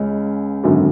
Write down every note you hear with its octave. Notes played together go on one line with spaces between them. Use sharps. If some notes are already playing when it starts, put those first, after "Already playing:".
Already playing: C#2 C#3 G#3 C#4
G#1 F#2 D3